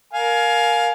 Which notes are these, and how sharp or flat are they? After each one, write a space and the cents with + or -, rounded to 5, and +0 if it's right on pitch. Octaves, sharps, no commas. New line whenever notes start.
A#4 +0 F5 +15 G#5 +25